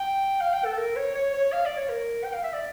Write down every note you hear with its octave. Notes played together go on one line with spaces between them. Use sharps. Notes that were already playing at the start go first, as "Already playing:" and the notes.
Already playing: G5
F5
G5
A4
A#4
C#5
C#5
C#5
F5
D5
C#5
A#4
G5
F5
E5
D5